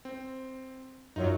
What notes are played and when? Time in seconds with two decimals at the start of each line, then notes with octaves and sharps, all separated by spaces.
0.05 C4
1.16 F#2 F#3 D#4 F4 C#5